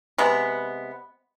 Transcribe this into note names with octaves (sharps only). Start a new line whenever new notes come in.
C3 G#3 B3